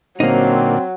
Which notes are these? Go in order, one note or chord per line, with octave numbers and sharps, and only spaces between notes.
A#2 D3 F#3 A#3 C4 D#4